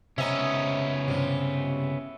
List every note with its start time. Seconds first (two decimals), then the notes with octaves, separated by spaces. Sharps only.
0.18 C#2 C3 B3 C#4 D#5 E5 A#5
1.08 G2 C3 E3